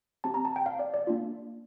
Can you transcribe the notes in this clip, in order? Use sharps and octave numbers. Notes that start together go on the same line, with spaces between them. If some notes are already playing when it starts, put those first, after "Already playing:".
C4 G4 A5
A#5
A5
G5
F5
D5
D5
A#3 D4 F4